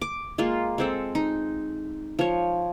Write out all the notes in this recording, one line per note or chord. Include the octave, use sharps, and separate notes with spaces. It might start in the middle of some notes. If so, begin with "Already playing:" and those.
D6
G#3 A#3 F4
G#3 C4 A4
D#4
F3 C#5